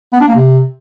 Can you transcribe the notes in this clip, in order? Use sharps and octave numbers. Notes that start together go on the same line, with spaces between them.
B3
D4
A#3
C3